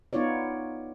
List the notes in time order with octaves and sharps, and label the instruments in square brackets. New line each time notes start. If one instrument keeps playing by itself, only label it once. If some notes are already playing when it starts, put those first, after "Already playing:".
[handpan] B3 D#4 F4 C#5 D5